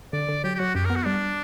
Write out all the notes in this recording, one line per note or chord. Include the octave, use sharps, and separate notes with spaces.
D3 D5
D3
F#3 G4
G4
F#3 F#4
F#2 G4
A#4
B3
F#4
G3 D4